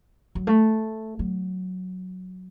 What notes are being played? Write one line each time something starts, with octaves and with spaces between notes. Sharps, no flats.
F#3
A3
F#3